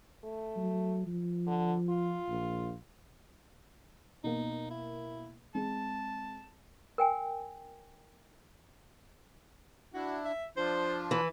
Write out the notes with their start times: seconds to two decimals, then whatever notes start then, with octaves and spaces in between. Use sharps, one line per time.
0.24 A3
0.56 F#3
1.07 F3
1.47 D3
1.89 F4
2.28 A#1
4.24 B2 A#3 D#4
4.70 E4
5.55 G#3 C4 G#4 A5
6.98 A#4 G5 G#5
9.94 D4 E4 F#4
10.25 E5
10.57 F3 D4 F4 C5
11.11 E3 B5